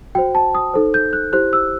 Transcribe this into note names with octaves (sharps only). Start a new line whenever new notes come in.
F#4 C5 G5
A5
D#6
D#4 A4 C5
G6
F#6
E4 G4 C5 F#6
E6